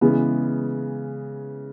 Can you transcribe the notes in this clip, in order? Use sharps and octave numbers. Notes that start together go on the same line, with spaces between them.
C#3 E3 G#3 B3